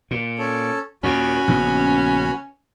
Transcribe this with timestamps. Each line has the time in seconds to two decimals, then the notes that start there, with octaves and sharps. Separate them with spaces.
0.11 A#2
0.39 C#4 A4
1.03 D#2 A#2 C#4 F#4 B5
1.48 A#1 C#3 B3